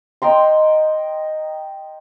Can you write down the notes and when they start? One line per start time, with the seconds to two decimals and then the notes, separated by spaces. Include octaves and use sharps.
0.22 D#5 G5 A#5 C6